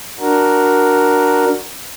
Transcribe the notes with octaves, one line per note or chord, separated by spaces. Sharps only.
D4 F#4 A#4